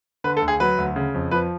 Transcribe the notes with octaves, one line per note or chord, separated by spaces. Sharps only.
D3 B4
A4
D2
G#4
F#3 B4
D2
C#3
F2
F3 B4